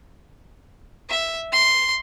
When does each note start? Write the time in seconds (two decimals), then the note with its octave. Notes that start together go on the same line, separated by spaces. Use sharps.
1.09 E5
1.52 C6